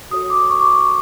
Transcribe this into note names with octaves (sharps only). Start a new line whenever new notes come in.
F#4 A4 C#5 D#6
D6
C#6
D6
C#6